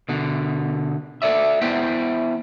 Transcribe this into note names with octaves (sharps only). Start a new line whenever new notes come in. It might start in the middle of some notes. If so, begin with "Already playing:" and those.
B2 D3
A4 C5 D5 E5
B3 E4 C5 E5 G5